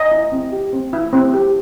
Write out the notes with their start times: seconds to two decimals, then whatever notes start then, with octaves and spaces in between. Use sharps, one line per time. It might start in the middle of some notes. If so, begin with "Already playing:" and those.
Already playing: D#5
0.12 E4
0.32 C4
0.52 G4
0.73 C4
0.93 E4
1.13 C4
1.34 G4